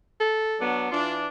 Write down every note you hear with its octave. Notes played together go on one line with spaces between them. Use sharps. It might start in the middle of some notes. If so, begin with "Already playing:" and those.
A4
F#3 B3 D4
E3 D4 F4